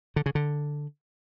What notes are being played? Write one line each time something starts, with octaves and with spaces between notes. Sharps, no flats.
D3
C#3
D3